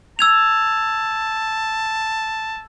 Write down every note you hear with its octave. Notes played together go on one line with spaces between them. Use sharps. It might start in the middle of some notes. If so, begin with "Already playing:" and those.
A5 E6 G#6 F7